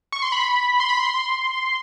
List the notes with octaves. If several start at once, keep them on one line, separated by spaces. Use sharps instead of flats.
C#6
C6
B5
C6
B5
C6